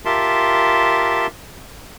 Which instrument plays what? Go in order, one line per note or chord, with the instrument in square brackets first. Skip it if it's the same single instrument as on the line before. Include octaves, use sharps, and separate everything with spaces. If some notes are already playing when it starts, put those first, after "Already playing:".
[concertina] F4 G4 A#4 E5 A5 C6